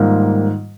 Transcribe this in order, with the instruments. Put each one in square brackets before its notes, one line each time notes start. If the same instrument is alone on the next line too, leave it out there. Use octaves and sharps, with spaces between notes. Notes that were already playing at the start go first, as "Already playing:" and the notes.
Already playing: [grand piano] G#2 D#3 G3 A#3 F4